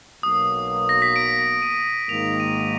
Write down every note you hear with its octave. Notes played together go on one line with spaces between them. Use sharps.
B1 B2 F#3 A#3 D#6
A#6
B6
D7
D#7
G#1 G#2 D#3 A#3 F7
D#7
D#7